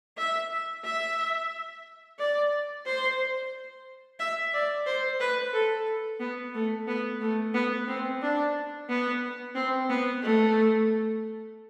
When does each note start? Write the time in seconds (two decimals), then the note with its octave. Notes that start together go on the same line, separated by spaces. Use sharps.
0.17 E5
0.85 E5
2.19 D5
2.86 C5
4.20 E5
4.53 D5
4.86 C5
5.20 B4
5.54 A4
6.20 B3
6.55 A3
6.87 B3
7.21 A3
7.54 B3
7.88 C4
8.22 D4
8.89 B3
9.55 C4
9.90 B3
10.23 A3